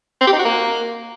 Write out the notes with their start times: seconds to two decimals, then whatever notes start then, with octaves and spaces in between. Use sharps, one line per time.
0.21 C4
0.27 G4
0.33 D#4
0.39 F#4
0.45 A#3